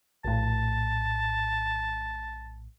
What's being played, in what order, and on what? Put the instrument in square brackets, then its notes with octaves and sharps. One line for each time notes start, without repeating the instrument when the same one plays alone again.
[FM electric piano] A#1 A2 [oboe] A5